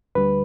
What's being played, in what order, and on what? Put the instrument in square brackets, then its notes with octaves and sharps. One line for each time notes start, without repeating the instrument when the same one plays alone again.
[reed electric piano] D2 D3 G3 B4